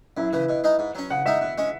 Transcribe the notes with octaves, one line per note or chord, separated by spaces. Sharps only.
F#2 E4
C#3 E3 B4
B2
G#3 D#4
G#2
F#3 C#4
C#3 F#5
G#3 D#4 E5
B2
G#3 C#4